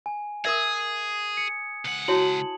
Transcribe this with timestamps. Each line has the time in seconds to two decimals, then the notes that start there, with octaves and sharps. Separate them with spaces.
0.06 G#5
0.45 G#4 A#4 E5 D#6 G#6
1.37 C#7
1.85 C#2 F#5
2.08 E4 F#4 C#5 A5 F#7